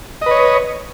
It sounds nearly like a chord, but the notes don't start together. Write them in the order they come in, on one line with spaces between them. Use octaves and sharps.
D#5 B4 C#5